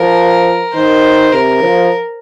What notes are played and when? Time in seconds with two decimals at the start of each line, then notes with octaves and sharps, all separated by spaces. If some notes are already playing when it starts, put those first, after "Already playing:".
Already playing: F3 A#4
0.73 D#3 C5
1.33 C3 A#4
1.63 F3